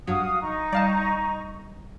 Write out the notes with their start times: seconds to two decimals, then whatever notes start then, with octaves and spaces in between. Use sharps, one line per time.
0.07 G2 F#3 F#4 F5 D#6
0.41 D#4 A#5 C#6
0.72 G3 D5 F5 A5